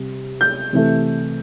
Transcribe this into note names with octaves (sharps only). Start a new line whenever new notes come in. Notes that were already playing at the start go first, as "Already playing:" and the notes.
Already playing: C3 G3
G6
C3 E3 A3